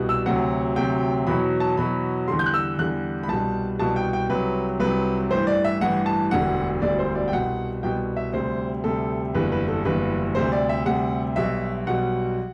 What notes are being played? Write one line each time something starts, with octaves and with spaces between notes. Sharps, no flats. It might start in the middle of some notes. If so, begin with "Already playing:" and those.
Already playing: C2 B2 G3
E6
D2 C3 F#3 F#5
D2 C3 F#3 G5
E2 B2 F#3 B5
A5
E2 B2 F#3 B5
E2 D3 G3 C6
G6
F#6
E6
E2 D3 G3 F#6
B5
C2 B2 G3 A5
C2 B2 G3 A5
G5
G5
C2 C3 F#3 B4
C2 C3 F#3 B4
A1 G2 E3 C5
D5
E5
A1 G2 E3 F#5
A5
E1 D2 D3 G3 F#5
E1 D2 D3 G3 D5
C5
D5
G5
C2 B2 G3 F#5
C2 B2 G3 G5
E5
D2 C3 G3 C5
D2 C3 G3 A4
F#1 E2 D3 G3 B4
B4
A4
F#1 E2 D3 G3 B4
D2 C3 G3 C5
D5
E5
D2 C3 G3 F#5
B1 B2 G3 E5
B1 B2 G3 F#5